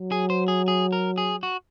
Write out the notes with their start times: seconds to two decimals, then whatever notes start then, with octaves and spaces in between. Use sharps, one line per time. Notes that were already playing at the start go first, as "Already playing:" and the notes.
Already playing: F#3
0.12 G#4
0.30 C5
0.48 G#4
0.68 G#4
0.93 A#4
1.18 G#4
1.43 F#4